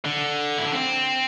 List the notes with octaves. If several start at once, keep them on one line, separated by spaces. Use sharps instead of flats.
D3
E4
D4
C4